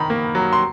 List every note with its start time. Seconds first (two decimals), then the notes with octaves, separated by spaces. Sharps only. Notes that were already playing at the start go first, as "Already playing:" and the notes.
Already playing: D#3 D#4 A#5 B5
0.10 A#3
0.35 F#3
0.53 C6